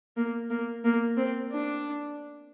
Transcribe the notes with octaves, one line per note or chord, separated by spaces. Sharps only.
A#3
A#3
A#3
C4
D4